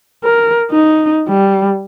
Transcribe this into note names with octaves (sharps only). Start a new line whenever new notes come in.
A#4
D#4
G3